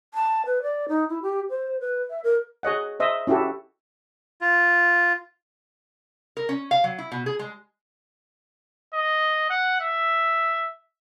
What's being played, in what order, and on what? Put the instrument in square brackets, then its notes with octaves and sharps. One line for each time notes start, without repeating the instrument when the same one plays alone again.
[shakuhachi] A5
B4
D5
D#4
E4
G4
C5
B4
E5
A#4
[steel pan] G#4 C#5 D#5 F#5
C5 D#5 E5
C#4 E4 F#4 G4 A4
[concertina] F4
[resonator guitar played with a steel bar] A#4
C#4
F5
F#3
E4
B2
G#4
G#3
[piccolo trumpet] D#5
F#5
E5